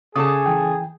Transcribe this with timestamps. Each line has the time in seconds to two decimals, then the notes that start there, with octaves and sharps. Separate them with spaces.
0.16 C#3 G#4 A4 A5 D6 D#6
0.46 E3 G5